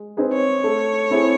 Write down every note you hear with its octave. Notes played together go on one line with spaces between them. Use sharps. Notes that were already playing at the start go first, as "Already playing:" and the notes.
Already playing: G#3
C4 D#4 G#4 B4
C#5
A3
C4 E4 G#4